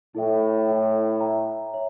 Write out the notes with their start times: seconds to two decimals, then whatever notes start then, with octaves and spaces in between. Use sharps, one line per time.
0.15 A2 E4 A4 E5 G5
0.68 E4 A4 E5 G5
1.20 C#5 E5 G5 A#5
1.74 C#5 E5